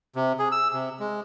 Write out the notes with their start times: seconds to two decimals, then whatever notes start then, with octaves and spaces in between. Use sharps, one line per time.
0.16 C3
0.39 G#4
0.52 E6
0.73 C3
1.00 G#3